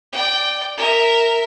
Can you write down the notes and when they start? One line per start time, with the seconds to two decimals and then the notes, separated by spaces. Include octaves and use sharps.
0.13 D5 G5
0.77 A#4 E5